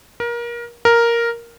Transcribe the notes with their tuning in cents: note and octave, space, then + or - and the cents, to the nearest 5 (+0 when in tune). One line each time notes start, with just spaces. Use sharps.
A#4 +25
A#4 +0